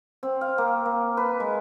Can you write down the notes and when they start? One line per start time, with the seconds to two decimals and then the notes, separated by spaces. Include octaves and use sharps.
0.23 C4
0.41 F5
0.58 A#3
0.85 A#3
1.17 B4
1.40 G#3